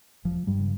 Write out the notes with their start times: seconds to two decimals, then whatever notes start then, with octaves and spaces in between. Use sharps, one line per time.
0.24 E1 F3
0.47 G2 G3
0.59 C#3